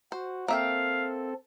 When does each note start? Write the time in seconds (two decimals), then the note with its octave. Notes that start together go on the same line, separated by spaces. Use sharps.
0.12 F#4 C5
0.48 A#3 C4 A4 E5 F5 G5